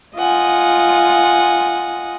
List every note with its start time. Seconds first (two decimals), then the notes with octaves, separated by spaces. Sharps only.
0.16 F4 D#5 F#5 G#5